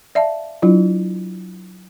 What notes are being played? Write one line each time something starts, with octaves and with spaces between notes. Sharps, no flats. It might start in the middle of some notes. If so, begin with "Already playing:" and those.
D5 E5 F5 A5
F#3 D4 E4 F4